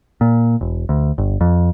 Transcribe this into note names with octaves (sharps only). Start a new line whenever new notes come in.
A#2
E1
D2
G1
F2